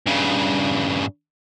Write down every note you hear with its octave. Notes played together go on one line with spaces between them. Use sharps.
G2 C#3